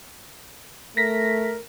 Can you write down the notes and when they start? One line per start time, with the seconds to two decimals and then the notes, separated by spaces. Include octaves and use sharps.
0.97 A3 A#4 A#6 B6